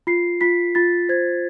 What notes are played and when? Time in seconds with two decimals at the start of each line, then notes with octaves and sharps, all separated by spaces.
0.07 F4 C7
0.41 F4 B6
0.75 F4 A6
1.09 C5 G#6